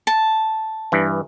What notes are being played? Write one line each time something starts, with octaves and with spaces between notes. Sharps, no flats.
A5
G2 E3